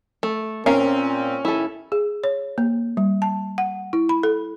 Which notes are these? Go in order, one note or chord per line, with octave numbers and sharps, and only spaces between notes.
A3
A#2 C4 C#4 A#4 F5
A1 D#2 E4 A4
G#4
C#5
A#3
G3
A5
F#5
E4
B5
A4